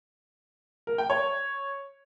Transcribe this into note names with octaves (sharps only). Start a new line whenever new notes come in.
A#4
G5
C#5